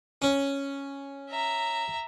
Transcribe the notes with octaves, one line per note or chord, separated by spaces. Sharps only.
C#4
E5 A#5